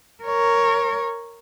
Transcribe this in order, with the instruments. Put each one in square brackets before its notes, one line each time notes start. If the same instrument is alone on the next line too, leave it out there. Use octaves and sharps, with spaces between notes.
[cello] A#4 C#5